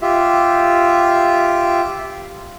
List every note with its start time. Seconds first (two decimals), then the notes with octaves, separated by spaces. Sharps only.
0.02 F4 G4 E5